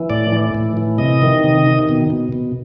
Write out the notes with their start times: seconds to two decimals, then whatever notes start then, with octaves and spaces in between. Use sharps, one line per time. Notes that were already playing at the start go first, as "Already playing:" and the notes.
Already playing: E3
0.10 A2 D5
0.32 E3
0.55 A2
0.77 E3
0.98 C3 D#5
1.22 D#3
1.44 C3
1.66 D#3
1.89 B2
2.10 B2
2.32 B2